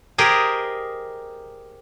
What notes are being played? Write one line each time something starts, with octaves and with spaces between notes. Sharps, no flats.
G4 G#4 A#4 C5 D#5